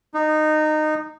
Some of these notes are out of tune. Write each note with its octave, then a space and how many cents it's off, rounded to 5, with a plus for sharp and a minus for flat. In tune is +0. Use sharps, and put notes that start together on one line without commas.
D#4 -20